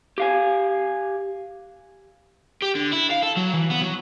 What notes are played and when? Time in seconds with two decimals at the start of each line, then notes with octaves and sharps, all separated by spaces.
0.18 G4 F5 G#5
2.62 G4
2.76 D3
2.93 E4
3.11 F5
3.23 A4
3.37 F#3
3.54 E3
3.71 B3
3.82 F#3